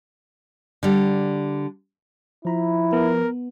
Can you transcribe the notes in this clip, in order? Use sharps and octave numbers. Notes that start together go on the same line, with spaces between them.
D3 G3
F3 E4 A#5 B5
B3 A#4